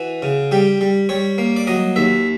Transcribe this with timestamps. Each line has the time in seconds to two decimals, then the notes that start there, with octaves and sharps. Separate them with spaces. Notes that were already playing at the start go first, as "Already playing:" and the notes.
Already playing: E3 F#4
0.22 C#3
0.51 G3 G4
0.81 G3
1.09 G3 C#5
1.38 A#3
1.56 D5
1.67 F#3 D#5
1.96 D#2 E5